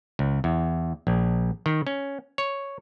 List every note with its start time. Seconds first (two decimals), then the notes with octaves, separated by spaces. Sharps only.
0.19 C#2
0.44 E2
1.07 A#1
1.66 D#3
1.87 C#4
2.38 C#5